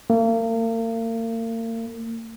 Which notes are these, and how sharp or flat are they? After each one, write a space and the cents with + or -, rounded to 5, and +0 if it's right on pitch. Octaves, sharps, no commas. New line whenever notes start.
A#3 -40